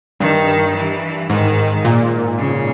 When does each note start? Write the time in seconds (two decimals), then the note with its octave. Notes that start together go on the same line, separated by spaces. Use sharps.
0.20 G2 D#3
0.75 E3
1.30 G#2 D#3
1.85 A#2
2.38 C#3